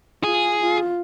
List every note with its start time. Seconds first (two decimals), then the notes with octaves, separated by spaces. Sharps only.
0.24 F4 G#4
0.61 F4